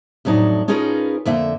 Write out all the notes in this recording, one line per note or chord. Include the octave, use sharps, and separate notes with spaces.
F2 A2 F#3 D4 D#4
C#4 D#4 F4 G#4 A#4 B4
F2 D3 A#3 E5